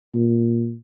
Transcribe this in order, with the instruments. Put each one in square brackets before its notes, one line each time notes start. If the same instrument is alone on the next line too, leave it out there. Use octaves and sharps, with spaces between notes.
[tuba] A#2